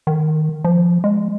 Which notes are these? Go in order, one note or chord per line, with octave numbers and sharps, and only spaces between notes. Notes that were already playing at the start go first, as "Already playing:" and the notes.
D#3
F3
G#3